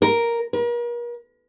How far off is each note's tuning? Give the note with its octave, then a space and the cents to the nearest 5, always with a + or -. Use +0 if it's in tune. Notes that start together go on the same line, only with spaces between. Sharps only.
A#4 +5
A#4 +40